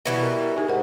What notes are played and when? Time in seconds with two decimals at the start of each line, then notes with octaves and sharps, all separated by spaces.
0.05 B2 E3 G3 B3
0.22 A#4
0.57 D#4 G4 G#4
0.69 G#2 A#4 F#5